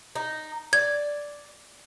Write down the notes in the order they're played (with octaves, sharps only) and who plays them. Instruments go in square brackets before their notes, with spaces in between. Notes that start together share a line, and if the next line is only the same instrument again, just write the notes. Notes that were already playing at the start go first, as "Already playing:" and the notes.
[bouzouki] D#4
[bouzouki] D5 [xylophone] G#6